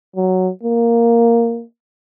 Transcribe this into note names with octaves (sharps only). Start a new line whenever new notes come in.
F#3
A#3